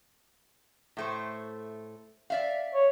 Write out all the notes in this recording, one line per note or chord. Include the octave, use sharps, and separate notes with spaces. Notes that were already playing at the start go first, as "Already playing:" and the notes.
A2 A3 C5
D5 E5 F5
C#5